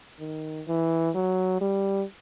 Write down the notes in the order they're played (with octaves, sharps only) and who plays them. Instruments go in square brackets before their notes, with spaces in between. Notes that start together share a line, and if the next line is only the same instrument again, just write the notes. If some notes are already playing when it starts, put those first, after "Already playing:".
[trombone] D#3
E3
F#3
G3